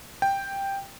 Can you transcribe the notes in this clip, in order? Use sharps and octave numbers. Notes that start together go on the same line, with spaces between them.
G5